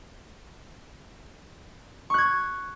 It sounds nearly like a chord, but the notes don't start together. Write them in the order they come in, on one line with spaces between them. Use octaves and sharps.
C#6 F#6 G#6